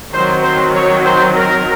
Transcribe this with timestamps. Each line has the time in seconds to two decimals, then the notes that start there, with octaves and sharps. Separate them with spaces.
0.13 D#3 F#3 C4 C5
0.43 C5
0.75 C#5
1.05 C5
1.37 A#4